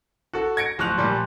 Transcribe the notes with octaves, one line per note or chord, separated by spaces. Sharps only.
F#4 A4
G#6 A#6 C#7 D7
D1 F3 C#6 F#6 F7
A#2 F3 G3